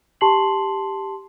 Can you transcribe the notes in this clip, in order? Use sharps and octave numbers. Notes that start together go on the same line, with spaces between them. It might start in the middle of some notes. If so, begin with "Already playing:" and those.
G4 A5 C6 C7 F#7